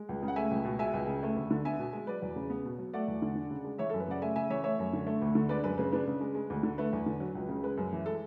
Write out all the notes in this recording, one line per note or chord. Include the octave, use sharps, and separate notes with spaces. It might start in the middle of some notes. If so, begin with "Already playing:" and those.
Already playing: G#3
C#2
C#3
F#5
A3 E5 G#5
C#2
B2
G#3 E5 G#5
C#2
C#3
A3
D2
D3
B3 E5 G#5
B2
G#3
F#3 B4 D5
E2
C#3
B3
B2
F#3
A3 D5 F#5
E2
D3
D4
C#3
G#3
E3 C#5 E5
F#2 A4
B4
C#3 D5 F#5
A3 E5 G#5
C#3 E5 G#5
E3 C#5 E5
A3 C#5 E5
F#2
D3
A3
D2
D3
G#3 B4 D5
F#2 B4
C#3 B4
D4 B4
C#3
G#3
G#3
D2
D3
A3 B4
E2
D3
F#3
C#2
C#3
G#3 B4
F#2
E3
G#3 A4